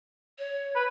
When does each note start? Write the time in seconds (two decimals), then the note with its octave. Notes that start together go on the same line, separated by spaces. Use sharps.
0.38 C#5
0.75 B4